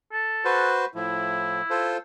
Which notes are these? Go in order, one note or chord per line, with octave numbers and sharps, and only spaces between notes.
A4
F#4 B4 C5
A2 F3 E4
F4 A4 C5